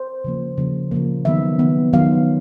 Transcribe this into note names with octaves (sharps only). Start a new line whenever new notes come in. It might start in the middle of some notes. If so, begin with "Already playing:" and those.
Already playing: C5
C#3 F3 A#3
C#3 F3 A#3
C#3 F3 A#3
D#3 F#3 B3 E5
D#3 F#3 B3
D#3 F#3 B3 F5